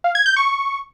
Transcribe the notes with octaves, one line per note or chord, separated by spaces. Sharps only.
F5
G#6
G6
C#6